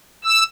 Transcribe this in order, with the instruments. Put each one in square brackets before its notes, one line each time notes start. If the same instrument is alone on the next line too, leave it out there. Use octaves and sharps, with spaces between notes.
[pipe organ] E6